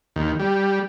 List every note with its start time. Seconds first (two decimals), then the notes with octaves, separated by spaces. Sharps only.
0.16 D#2
0.39 G3